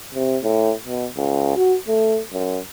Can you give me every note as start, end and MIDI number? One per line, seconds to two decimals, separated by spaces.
0.14 0.37 48
0.44 0.73 45
0.87 1.07 47
1.16 1.55 37
1.57 1.77 66
1.88 2.20 57
2.33 2.59 42